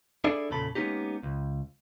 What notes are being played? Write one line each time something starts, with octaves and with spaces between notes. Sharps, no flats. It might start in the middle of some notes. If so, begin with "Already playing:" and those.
D4 E4 G#4 A4 D5
E2 A#2 C#3 A4 B5
G#3 A#3 B3 C#4 D#4 G4
C#2